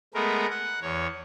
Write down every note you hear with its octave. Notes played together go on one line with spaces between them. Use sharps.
G#3 A3 B3 A#4
F#5
E2 C#5